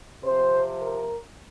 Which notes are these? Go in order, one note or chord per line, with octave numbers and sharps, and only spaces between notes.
C3 F3 C4 C5
A#4